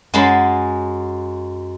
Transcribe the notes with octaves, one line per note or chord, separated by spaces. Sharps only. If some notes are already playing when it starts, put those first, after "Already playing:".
F#2 G#3 A5 B5 C6